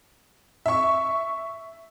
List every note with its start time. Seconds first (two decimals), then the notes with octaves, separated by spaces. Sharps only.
0.66 E5 C#6